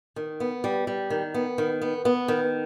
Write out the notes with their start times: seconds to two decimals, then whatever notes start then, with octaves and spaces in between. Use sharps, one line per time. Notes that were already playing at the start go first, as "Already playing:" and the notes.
0.16 D#3
0.40 B3
0.64 G3
0.87 G3
1.10 D#3
1.34 B3
1.58 D#3
1.82 B3
2.05 B3
2.28 D#3